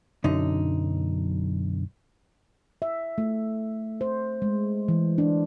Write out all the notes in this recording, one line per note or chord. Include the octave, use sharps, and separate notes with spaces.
B1 F#2 D3 D#4
E5
A3
C5
G#3
E3
D4